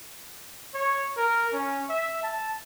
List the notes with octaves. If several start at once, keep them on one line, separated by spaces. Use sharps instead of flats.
C#5
A#4
C#4
E5
A5